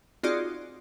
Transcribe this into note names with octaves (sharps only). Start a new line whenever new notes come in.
C4 D#4 F4 F#4 G#4 D5